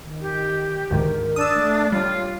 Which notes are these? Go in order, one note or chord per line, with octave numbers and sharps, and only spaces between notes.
D#3
G4
D2 G#2 D#3 A#4
D4 D#6 E6
A3
G3 F4 C#5